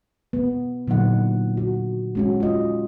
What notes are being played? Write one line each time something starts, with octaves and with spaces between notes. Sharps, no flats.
B3
A#2 D3 F#3 D#4 F#5
F#4
G#3 C#4 F#4
F4 D#5